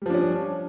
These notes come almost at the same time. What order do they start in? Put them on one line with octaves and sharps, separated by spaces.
G3 F3 D4 C#4